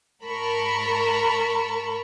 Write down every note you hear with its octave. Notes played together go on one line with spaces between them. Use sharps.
G#2 A#4 A5 B5 C#6